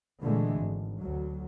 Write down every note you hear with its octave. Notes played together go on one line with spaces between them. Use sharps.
A#2 D3 E3 G#3 A3
G#1
D2 F#3